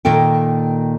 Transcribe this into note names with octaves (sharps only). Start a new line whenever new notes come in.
A#2 D#3 A4 G5